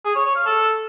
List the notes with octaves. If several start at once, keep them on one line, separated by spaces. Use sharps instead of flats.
G#4
C#5
C#5
F5
A4